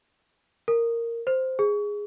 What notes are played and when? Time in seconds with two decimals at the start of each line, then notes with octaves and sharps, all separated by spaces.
0.68 A#4
1.27 C5
1.59 G#4